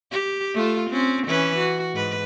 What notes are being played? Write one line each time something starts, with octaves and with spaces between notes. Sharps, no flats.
G4
A3 F4
C4 C#4
E3 C#4 B4
F#4
G#2 B4